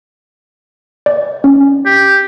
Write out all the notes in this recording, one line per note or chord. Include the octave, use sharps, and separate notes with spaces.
D5
C#4
G4